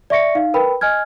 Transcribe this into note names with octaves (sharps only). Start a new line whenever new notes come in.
D5 E5 C#6 A#6 C#7
D#4 F5
A#4 B4 G5 B5
D#5 G#5 F6 G#6